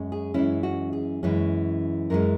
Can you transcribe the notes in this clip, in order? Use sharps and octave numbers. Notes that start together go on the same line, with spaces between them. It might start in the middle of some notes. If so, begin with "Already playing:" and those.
Already playing: F#2 G#3 C#4
G#4
F#2 E3 G#3 C#4 E4
F#4
G#4
F#2 E3 G#3 C#4
F#2 E3 G#3 C#4 A#4